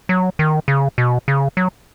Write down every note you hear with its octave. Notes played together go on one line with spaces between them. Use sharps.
F#3
D#3
C#3
B2
C#3
F#3